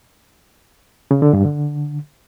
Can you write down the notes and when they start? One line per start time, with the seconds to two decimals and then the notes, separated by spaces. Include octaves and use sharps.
1.11 C#3
1.22 D3
1.33 G2
1.45 D3